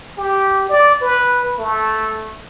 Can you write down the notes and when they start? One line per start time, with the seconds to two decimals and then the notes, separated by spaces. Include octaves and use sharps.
0.18 G4
0.70 D5
1.02 B4
1.58 A3